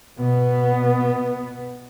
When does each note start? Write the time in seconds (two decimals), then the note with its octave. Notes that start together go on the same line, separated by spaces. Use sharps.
0.19 B2 B3